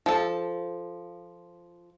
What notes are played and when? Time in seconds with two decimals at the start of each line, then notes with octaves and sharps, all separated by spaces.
0.06 F3 A4